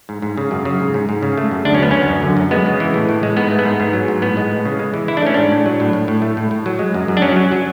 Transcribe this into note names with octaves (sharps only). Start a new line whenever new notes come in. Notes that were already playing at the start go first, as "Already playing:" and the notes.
G#2
G#2
C#3
F#2
C#3
G#2
G#2
G#2
C#3
A3
F#2
D2 D4
C#4
D2 B3
D2 C#4
F#2
D3
F#2
G#3 B3
C#3
E3
A2
A2
G#3
G#2 B3
A3
B3
G#2
G#2
F#3
G#2
A2 B3
G#3
A2
C#3
G#3
E3
E3 E4
D4
A3 C#4
G#2 D4
A2
F#3
A2
A2
A2
A3
A2
A2
F#3
G#3
F#2
F#2
D4
F#3 C#4
F#3
F#3